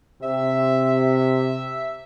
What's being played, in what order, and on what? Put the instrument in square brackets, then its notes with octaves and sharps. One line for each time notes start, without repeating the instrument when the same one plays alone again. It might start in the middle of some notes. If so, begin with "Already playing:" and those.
[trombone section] C3 [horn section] E5